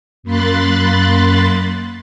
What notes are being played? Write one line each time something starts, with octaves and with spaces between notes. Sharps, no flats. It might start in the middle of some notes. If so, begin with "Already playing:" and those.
F#2 A#3 B5 C6 F#6 A6